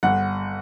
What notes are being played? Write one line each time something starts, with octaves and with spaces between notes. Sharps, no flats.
G1 F#5